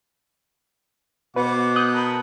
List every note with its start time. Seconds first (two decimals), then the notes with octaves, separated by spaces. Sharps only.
1.36 B2 B4 C5 F#5 D6
1.76 D#6 F#6 G6
1.93 A#4 A5 B5